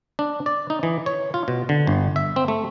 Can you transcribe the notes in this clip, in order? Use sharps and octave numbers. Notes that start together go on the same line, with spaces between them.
D4
D5
D#4
E3
C#5
F4
B2
D3
G1
E5
C4
A3